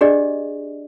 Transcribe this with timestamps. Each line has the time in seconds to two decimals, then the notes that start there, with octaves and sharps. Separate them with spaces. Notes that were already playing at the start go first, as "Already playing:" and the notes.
0.01 D4 G4 G#4 D5 D#5